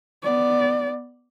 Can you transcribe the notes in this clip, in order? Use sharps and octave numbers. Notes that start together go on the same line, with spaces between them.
B3 D5